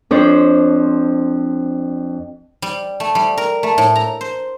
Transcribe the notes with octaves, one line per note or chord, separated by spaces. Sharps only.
F2 D4 C5 C#5
G3
A3
G3
A#4
A3
A2
A#5
C5